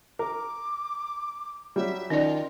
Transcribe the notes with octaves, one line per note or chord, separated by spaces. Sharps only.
A#4 D6
F#3 G3 E5
D#3 C#4 F4 D5